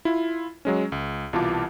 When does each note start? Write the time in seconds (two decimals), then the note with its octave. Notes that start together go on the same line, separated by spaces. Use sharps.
0.05 E4 F4
0.65 F#3 G#3 C#4
0.92 C#2
1.33 C2 B2 E3 F4 A5 D6